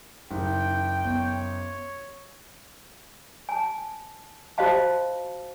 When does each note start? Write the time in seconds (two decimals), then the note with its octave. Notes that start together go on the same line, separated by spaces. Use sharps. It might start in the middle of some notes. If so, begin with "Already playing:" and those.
0.31 F#1 D#3 G5
1.04 B3 C#5
3.49 G#5 A5
4.58 F4 F#4 C5 D#5 F5 A5